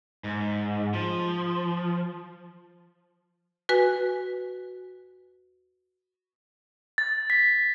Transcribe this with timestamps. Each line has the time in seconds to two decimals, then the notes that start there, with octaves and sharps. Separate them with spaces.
0.24 G#2
0.94 F3
3.69 F#4 B4 G#5
6.98 A6
7.30 B6